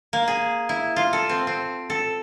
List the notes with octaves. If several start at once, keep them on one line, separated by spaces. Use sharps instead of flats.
A#3
G#4
E4
F4
A4
C4
C4
A4